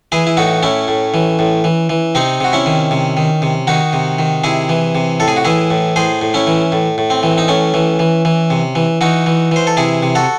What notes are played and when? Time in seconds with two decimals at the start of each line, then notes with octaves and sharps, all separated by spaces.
0.12 E3 E4 G#4
0.27 E4
0.37 A2 D#4 F#4
0.63 A2 C#4 E4
0.88 A2
1.14 E3
1.39 A2
1.64 E3
1.89 E3
2.15 C3 C4 D#4
2.40 C3 F#4
2.53 C#4 E4
2.66 D#3
2.91 C3
3.17 D#3
3.42 C3
3.67 D#3 D#4 F#4
3.93 C3
4.19 D#3
4.44 C3 E4 G#4
4.69 E3
4.95 C3
5.20 A2 A4
5.28 G#4
5.36 F#4
5.45 E3 E4 G#4
5.71 A2
5.96 A2 G#4 C5
6.21 A2
6.34 C#4 E4
6.47 E3
6.72 A2
6.98 A2
7.10 C4
7.23 E3
7.38 D#4
7.48 A2 C#4
7.74 E3
7.99 E3
8.25 E3
8.50 C3
8.75 E3
9.01 E3 D#4 F#4
9.26 E3
9.51 E3 C5
9.67 A4
9.77 C3 E4 G#4
10.03 C3
10.15 F#4 A4